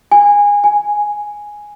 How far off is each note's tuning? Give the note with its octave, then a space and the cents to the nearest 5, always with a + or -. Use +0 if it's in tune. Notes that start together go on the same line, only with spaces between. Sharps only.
G#5 -20
G#5 +0